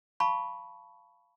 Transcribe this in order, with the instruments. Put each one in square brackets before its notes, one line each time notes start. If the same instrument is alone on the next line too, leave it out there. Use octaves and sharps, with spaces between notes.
[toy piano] F5 A5 B5 C#6